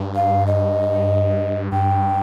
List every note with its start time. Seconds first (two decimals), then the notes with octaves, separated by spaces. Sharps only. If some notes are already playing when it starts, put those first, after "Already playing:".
Already playing: G2
0.15 F5
0.47 D#5
1.72 G2 G5